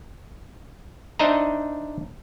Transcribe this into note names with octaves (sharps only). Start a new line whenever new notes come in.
D4 D#4 C5 D#5 E5 A#5